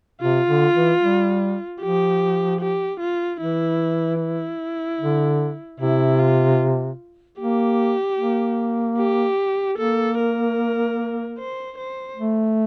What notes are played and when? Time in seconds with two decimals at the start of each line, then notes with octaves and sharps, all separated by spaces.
0.21 C3 F4
0.49 D3
0.74 E3
1.02 G3
1.81 F3 G4
2.61 G4
3.00 F4
3.40 E3 E4
4.20 E4
5.00 D3
5.80 C3 E4
6.19 F4
7.39 A#3 G4
8.18 A#3
8.98 G4
9.78 A#3 A4
10.18 A#4
11.38 C5
11.78 C5
12.17 A3